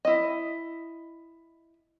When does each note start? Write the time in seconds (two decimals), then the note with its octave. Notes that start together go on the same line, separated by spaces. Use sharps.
0.05 E4 D#5